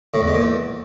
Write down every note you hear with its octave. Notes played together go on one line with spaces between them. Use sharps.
A2
E2
G#2
A#2
E2